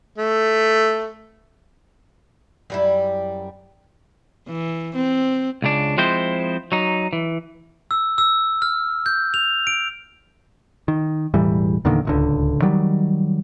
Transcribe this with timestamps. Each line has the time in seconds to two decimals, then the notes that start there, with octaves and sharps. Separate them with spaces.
0.18 A3
2.70 F#2 G3 E4
4.48 E3
4.96 C4
5.62 C#2 C#3 D4
5.98 F3 G#3 C4 E4 C5
6.72 F#3 D#4
7.13 E3
7.91 E6
8.18 E6
8.62 F6
9.06 G6
9.34 F7
9.67 D7
10.88 D#3
11.34 E1 A2 E3 G3
11.85 E2 A#2 D3 D#3
12.05 D1 C#2 D3
12.62 D#3 F#3 G3